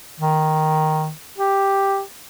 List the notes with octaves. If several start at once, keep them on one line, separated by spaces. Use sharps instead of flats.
D#3
G4